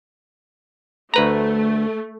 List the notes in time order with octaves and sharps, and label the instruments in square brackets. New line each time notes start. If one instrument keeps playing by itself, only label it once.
[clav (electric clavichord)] D2 B4 A#5 [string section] A3